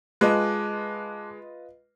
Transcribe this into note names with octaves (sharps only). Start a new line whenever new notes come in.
G#3 F4 B4 D#5 A5 D6 F#6